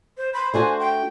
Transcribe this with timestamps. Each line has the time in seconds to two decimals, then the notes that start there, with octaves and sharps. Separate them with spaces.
0.17 C5
0.33 C5 B5
0.54 A3 D4 F#4 G#5
0.80 G5